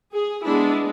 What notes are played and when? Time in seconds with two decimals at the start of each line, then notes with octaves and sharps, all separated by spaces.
0.14 G#4
0.44 G#3 B3 D4 E4